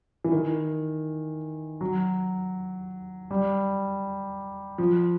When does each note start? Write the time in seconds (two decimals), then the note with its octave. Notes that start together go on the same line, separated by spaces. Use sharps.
0.24 E3
0.32 D#3
1.81 F#3
3.31 G3
4.78 F3